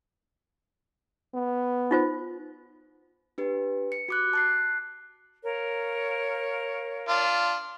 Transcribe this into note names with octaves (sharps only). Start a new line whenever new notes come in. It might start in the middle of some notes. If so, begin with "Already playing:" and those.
B3
D#4 F4 C5
D4 G4 B4
C#7
F#4 D6 F#6
A5 F#6 C7
A#4 C#5 F5
D4 F4